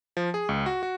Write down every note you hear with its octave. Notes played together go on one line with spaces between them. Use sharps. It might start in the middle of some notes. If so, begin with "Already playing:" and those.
F3
G#4
C#2
F#4
F#4